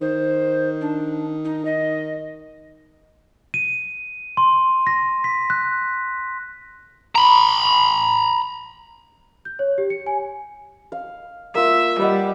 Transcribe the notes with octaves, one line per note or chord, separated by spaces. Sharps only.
D#3 C5
D4
D#4
D#5
D#7
C6
A#6
B6
F#6
A#5 B5
G6
C#5
G4
C#7
G#5
F5
A#3 F4 E5
G3 B4 D#5 F#5